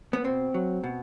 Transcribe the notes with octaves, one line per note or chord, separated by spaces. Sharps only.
B3
B2 C4
F#3
B2